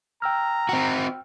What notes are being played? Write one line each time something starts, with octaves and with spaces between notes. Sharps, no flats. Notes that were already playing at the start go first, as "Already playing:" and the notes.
G5 A#5 E6 F6
C4 F#4